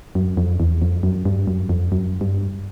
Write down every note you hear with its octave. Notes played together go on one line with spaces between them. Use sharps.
F#2
F2
E2
F2
F#2
G2
F#2
F2
F#2
G2